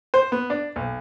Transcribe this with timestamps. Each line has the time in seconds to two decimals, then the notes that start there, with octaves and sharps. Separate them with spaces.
0.14 C5
0.32 B3
0.50 D4
0.76 B1